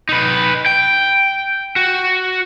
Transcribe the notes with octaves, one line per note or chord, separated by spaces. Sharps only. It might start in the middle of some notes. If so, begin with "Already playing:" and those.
D#4 B4
G5
F#4